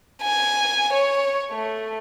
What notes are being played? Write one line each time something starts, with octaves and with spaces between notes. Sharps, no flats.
G#5
C#5
A3